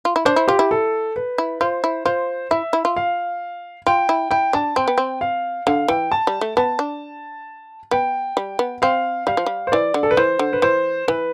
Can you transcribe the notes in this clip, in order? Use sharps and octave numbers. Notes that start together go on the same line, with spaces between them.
F4
E4
D4 C5
E4
F4 G4
E4
A4
B4
E4
F4 C5
E4
F4 C5
E4 E5
E4
F4
F5
F4 G5
E4
E4 G5
D4 A5
C4 G5
B3
C4
F5
D3 F5
E3 G5
A5
G3
A3
B3 A5
D4
B3 G5
G3
B3
C4 F5
G3 F5
F3
G3
C5
E3 D5
D3
A4
B4
E3 C5
D3
B4
E3 C5
E3 B4